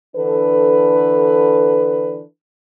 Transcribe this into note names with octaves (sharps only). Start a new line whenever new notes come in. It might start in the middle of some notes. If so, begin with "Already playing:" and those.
D3 E3 D4 A4 B4